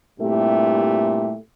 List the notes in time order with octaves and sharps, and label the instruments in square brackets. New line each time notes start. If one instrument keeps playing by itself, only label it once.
[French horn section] G2 A#2 A3 C4 E4 G4